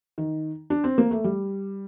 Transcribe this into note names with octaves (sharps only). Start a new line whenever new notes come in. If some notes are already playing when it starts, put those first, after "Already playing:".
D#3
D4
C4
A#3
A3
G3